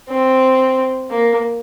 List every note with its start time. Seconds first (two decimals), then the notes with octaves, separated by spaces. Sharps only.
0.09 C4
1.10 A#3